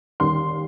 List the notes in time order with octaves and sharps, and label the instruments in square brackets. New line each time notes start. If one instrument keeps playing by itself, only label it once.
[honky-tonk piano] D#2 D#3 G3 C6